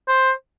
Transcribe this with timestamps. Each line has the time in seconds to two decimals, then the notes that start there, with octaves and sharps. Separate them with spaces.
0.08 C5